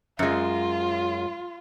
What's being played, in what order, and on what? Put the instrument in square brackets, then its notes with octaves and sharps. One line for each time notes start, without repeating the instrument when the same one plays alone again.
[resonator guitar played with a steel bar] F#2 G#3 [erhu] F4